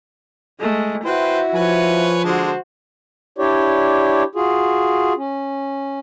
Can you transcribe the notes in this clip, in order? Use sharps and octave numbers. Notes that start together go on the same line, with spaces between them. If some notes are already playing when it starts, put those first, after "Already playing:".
G#3 A3
E4 F#4 B4 C5 E5 G5
F3 B4 C#5 G#5
D3 G#3 F#4 C5 A5
D4 E4 G4 C#5 D5
F4 F#4 G#4
C#4